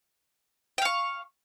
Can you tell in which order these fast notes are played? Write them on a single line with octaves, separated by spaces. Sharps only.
G5 F5 C#6